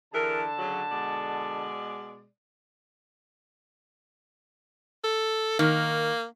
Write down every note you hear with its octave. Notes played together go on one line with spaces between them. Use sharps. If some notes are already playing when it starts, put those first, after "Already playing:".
D3 E3 G#4 A#4 A5
C#3 F#3
B2 G#3 D5
A4
D#3 A#3